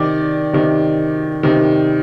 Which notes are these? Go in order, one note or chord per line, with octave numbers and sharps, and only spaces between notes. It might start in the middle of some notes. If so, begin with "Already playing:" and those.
Already playing: C3 D#3 D5
C3 D#3
C3 D#3